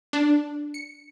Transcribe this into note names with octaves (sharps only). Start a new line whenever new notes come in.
D4
C#7